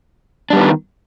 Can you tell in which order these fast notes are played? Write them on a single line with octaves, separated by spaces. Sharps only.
D4 G3 B3 D#3